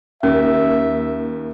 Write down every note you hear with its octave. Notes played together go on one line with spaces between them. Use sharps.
D#2 C#4 E5